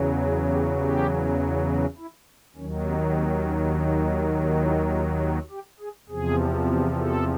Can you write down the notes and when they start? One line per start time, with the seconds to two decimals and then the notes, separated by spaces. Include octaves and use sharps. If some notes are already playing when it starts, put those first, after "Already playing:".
Already playing: E2 C#3 F#3
0.21 F#4
0.51 G4
0.80 G4
1.68 F#4
1.97 E4
2.56 D#2 D#3 F#3 C#4
2.85 C4
3.15 C4
3.45 C#4
3.74 D4
4.03 D#4
4.33 D#4
4.62 E4
4.91 F4
5.21 F#4
5.50 G4
5.80 G#4
6.09 E2 C3 F3 G#4
6.98 A4